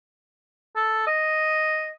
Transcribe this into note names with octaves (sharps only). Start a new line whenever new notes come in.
A4
D#5